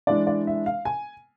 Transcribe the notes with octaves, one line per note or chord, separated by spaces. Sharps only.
E3 G#3 D4 D5
D5
E5
F5
G#5